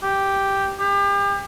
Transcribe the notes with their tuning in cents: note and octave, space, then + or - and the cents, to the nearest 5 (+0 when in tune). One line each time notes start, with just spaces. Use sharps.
G4 +0
G4 +35